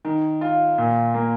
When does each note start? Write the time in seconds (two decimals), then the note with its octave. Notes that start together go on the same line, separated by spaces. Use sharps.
0.05 D#3
0.41 F4
0.78 A#2
1.14 A#3